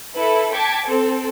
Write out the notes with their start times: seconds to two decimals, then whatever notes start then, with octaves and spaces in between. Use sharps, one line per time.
0.14 E4 A4 B4
0.53 G5 A5 D6 G#6 B6 C#7
0.85 C4 A4